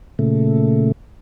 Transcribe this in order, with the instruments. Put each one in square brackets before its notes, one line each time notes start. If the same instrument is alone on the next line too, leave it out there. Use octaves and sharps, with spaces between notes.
[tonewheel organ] A#2 C#3 A3